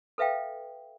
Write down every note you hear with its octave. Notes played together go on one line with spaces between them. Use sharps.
A4 B4 E5 F5 G5